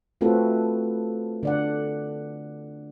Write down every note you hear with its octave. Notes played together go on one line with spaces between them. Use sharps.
A3 C4 F4 F#4 A4 B4
D3 D5 F#5